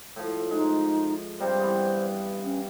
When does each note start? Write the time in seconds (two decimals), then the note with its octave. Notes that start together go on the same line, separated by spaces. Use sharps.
0.16 A2 F3
0.51 G#3 D#4
1.40 G2 C3 G3 C5
1.59 E3 B3
2.44 C#4